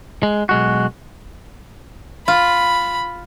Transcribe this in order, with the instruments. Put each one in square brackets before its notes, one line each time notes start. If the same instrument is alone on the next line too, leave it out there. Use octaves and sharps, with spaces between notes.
[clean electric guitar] G#3
B1 G#3 F#4
[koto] F4 [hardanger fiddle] B5